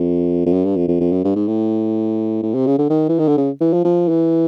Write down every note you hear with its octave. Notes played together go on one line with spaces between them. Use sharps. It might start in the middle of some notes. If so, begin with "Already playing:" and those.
Already playing: F2
F2
F#2
G2
F2
F2
F2
F#2
G2
G#2
A2
A2
C3
C#3
D3
D#3
E3
D#3
D3
C#3
E3
F3
F3
E3